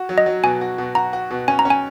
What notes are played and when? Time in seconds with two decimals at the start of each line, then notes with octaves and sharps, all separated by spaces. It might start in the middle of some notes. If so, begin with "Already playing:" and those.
Already playing: F#4
0.09 F#3
0.18 D#5
0.26 F#3
0.43 B2 G#5
0.61 F#4
0.78 B2
0.95 F#4 A#5
1.13 F#4
1.30 B2
1.48 C#4 G#5
1.59 A#5
1.65 C#4
1.70 G#5